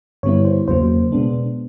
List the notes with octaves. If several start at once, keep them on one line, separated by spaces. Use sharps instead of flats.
G2 D3 G3 B3 E4 C#5
C5
E2 C#3 F#3 A#3 C5
B2 G#3 B3 D4